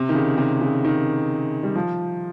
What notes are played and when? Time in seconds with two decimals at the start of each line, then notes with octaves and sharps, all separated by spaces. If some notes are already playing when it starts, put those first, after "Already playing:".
Already playing: C3
0.09 D#3
0.15 C#3
0.38 C3
0.61 C#3
0.85 D#3
1.63 G3
1.75 F3